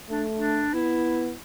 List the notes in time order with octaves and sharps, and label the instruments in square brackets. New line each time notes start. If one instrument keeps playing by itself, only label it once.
[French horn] A3 [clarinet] D4
[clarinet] D4
[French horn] B3 [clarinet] E4